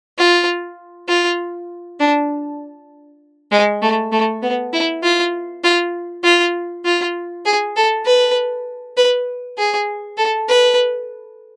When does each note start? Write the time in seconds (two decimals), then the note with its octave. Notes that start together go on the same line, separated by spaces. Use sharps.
0.18 F4
1.08 F4
2.00 D4
3.51 G#3
3.82 A3
4.12 A3
4.42 B3
4.73 E4
5.03 F4
5.64 F4
6.24 F4
6.85 F4
7.46 G#4
7.76 A4
8.06 B4
8.97 B4
9.58 G#4
10.18 A4
10.49 B4